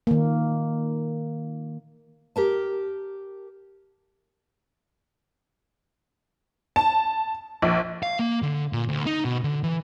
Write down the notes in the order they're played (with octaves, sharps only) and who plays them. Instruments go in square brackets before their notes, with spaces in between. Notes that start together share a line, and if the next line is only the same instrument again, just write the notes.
[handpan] D#3 A#3
[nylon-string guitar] G4 A#4 A5
[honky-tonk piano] A5
A#1
[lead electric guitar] F5
A#3
D3
A#2
D2
D#4
B2
D3
E3